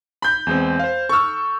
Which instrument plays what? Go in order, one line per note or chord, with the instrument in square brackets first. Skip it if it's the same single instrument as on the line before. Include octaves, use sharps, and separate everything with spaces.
[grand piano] B5 G6
[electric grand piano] E2 G#3 C4
C5 F5
[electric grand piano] A4 F6 [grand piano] C#6 E6